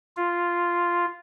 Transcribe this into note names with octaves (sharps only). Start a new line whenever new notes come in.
F4